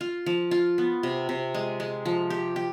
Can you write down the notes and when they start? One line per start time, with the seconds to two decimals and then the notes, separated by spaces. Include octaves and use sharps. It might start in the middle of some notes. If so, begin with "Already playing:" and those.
0.01 F4
0.26 F3
0.51 F4
0.78 B3
1.03 C3
1.29 C3
1.54 G#3
1.80 G#3
2.05 F3
2.30 G4
2.56 G4